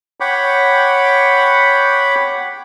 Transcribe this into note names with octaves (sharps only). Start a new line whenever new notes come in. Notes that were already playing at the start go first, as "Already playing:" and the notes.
C#5 F#5 G5 B5 D6